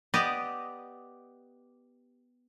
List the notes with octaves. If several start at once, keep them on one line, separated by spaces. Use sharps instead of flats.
B3 G4 D5 D#5